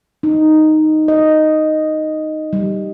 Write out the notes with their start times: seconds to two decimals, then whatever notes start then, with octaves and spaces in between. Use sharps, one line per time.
0.23 D#4
1.08 D#5
2.53 G3